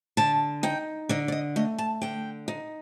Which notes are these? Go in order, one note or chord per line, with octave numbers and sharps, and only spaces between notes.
D3 A5
D#4 G5
D3 D#5
D5
D#5
A3 D#5
A5
D3 G5
D#4